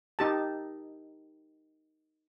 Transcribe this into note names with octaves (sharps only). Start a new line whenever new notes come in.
D#4 G4 A5